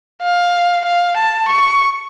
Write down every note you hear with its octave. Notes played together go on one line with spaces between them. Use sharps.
F5
F5
A5
C#6